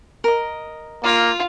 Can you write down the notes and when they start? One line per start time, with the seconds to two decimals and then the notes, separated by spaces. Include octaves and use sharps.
0.24 A#4 D#5
1.03 A#3 F4